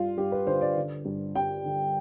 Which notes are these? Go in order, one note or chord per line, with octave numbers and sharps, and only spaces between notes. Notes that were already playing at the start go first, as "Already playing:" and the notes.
Already playing: G2 G3 F4
G2 G4
B4
D3 C5
D5
D3
G2
G3 G5
D3